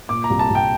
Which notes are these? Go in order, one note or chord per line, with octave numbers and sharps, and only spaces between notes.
A#2 D6
A#5
C2
A5
C2
G5